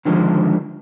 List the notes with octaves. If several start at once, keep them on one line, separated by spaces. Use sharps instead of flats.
D3 D#3 F3 G#3 G4